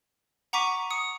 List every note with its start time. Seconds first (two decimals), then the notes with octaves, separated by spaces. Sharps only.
0.53 F#5 A#5 C#6 D6 B6 D#7
0.90 D#6 C#7